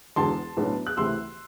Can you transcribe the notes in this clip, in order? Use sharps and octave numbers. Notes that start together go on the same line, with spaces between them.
E1 E2 D3 A5 C6
B1 A2 F#3 B3 D4
F#6
D2 C3 E3 A3 C4 C6 E6